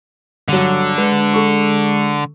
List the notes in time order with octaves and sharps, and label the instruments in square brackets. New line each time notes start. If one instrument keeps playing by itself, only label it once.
[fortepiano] G2 F#3 [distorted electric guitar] D3
[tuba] G#3 [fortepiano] B4
[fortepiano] A4 C#6